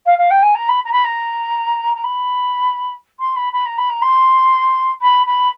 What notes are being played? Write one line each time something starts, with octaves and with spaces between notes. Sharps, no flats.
F5
F5
G5
G#5
A#5
B5
A#5
B5
A#5
A#5
B5
C6
B5
B5
A#5
B5
A#5
C6
B5
B5